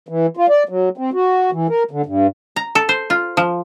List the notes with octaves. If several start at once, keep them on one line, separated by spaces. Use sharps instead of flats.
E3
F4
D5
F#3
C4
F#4
E3
A#4
D3
G2
A#5
A4
C5
F4
F3